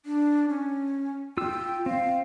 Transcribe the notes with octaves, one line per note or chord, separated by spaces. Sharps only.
D4
C#4
F4 G5 E6
C4 F5